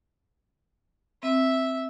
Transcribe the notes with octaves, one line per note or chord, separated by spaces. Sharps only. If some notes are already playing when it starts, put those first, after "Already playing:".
C4 E5